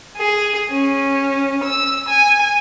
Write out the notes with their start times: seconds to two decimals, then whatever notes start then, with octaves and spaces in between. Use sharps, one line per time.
0.17 G#4
0.70 C#4
1.63 E6
2.08 G#5